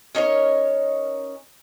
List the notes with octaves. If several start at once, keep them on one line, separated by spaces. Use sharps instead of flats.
C#4 D#4 A#4 C#5